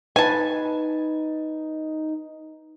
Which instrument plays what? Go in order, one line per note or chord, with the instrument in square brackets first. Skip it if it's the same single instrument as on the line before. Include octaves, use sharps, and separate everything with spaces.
[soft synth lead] D#4 [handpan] B4 [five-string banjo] G#5 A5